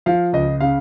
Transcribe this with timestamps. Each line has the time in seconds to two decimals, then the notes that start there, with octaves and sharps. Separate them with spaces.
0.06 F3 F5
0.33 C#2 D#5
0.61 C#3 F5